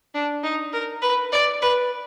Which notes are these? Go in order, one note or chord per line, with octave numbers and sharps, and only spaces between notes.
D4
D#4
A#4
B4
D5
B4